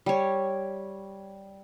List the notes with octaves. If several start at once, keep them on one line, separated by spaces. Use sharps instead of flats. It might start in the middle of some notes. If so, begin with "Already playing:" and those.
G3 C#5